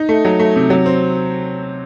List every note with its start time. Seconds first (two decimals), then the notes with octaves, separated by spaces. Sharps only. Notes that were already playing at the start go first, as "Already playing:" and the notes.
Already playing: D#4
0.09 A3
0.25 F#3
0.40 A3
0.56 C3
0.70 F#3
0.86 C4